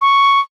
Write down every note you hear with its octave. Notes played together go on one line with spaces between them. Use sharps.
C#6